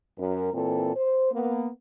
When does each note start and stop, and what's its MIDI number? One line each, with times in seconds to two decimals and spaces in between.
0.18 0.53 42
0.18 0.53 70
0.54 0.94 46
0.54 0.94 52
0.54 0.94 60
0.54 0.94 69
0.95 1.30 72
1.32 1.68 58
1.32 1.68 59